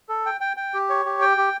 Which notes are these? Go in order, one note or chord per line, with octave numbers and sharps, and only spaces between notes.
A4
G5
G5
G5
G4
C#5
G4
G5
G4